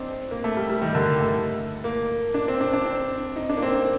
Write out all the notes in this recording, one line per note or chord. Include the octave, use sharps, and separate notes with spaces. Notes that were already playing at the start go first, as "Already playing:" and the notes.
Already playing: C4 D4 D#4
A#3
A3
G3
G3
D#3
D3
G3
A3
A#3
D4
C4
D4
D4
C4
D#4
D4
A#3
C4
D4